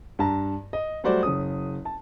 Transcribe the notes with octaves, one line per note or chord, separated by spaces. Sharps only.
G2 A5 A#5
D#5
F#3 G3 A3 F#4 C5 D5
F#1 C#4 D#6
A5